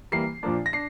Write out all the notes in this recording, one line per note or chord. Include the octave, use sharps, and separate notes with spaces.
E3 G3 A#3 C7
A#2 F3 A#3 D4
A#6
D4 C7